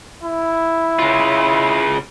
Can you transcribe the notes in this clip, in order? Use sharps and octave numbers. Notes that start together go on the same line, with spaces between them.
E4
C#3 F4